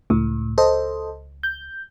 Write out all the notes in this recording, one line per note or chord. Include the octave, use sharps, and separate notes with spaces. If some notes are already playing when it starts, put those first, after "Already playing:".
C#2 A2
A4 C5 D#5
G6